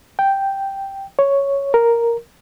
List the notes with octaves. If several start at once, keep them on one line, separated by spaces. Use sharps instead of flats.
G5
C#5
A#4